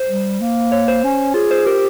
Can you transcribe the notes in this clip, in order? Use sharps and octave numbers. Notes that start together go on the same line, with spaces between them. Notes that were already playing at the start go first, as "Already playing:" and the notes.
Already playing: C5
G3
A#3
C#5
C5
C#4
F4 G#4
C5
G4 A#4